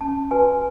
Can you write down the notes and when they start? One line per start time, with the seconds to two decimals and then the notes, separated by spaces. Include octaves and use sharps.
0.01 C#4 A5
0.31 F#4 B4 G#5